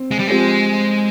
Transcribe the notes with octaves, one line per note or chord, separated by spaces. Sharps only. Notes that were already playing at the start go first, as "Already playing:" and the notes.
Already playing: C4
G#3
G3
F3 G#3 C4 G4